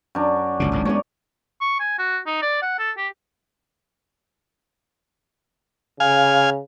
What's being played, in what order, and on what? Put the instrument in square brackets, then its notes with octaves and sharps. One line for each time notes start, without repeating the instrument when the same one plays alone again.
[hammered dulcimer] F#2 D4
[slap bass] G1 C#2 B2
G#1 C#2 A2
[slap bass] G#3 A3 B3 [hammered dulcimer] C#5 D5
[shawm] C#6
G#5
F#4
D#4
D5
F#5
A4
G4
[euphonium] C#3 [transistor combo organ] F5 G#5